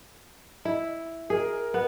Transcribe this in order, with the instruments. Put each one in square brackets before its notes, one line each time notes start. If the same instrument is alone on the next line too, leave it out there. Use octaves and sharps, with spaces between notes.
[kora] E4
[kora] G#4 [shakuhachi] A#4
[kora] B3